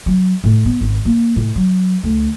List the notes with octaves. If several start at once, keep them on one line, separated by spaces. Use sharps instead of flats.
F#3
A2
B3
G#1
A#3
A2
F#3
D2